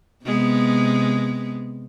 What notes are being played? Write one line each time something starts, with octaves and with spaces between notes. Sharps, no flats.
C3 G#3 B3